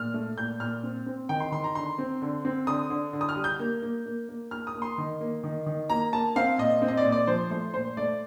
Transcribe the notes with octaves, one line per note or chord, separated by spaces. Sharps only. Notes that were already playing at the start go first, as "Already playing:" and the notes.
Already playing: A#2 F6
A3
A#2 G6
A#2 F6
C4
C4
D#3 G5
C6
D#3 C6
A#5
D3 C6
C4
D3
C4
D3 D#6
D3
D3
D#6
F6
G3
G6
A#3
A#3
A#3
A#3
A#3 F6
D#6
A#3
C6
D#3
A#3
D#3
D#3
A#3 A#5
A#3 A5
C4 F5
A#2 D#5
C4
D#5
D5
A#2
D5
F3 C5
A3 C5
A#2 C5
A3 D5